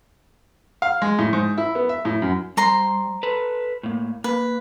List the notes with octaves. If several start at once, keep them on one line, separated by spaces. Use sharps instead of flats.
F5
G#3
A2
G#2
E4
B3
E5
A2
F#2
G3 C5 A#5 C6
A4 B4
A2 A#3
A#3 B4